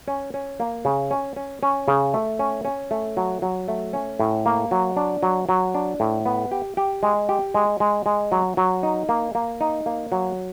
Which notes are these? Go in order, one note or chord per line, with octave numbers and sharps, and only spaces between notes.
C#4
C#4
A#3
C#3
C#4
C#4
C#4
C#3
A3
C#4
C#4
A3
F#3
F#3
A3
C#4
A2
A#3
F#3
D4
F#3
F#3
D4
A2
B3
G4
G4
G#3
G4
G#3
G#3
G#3
F#3
F#3
D#4
A#3
A#3
D#4
A#3
F#3